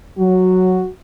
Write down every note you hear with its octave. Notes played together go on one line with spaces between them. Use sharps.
F#3 F#4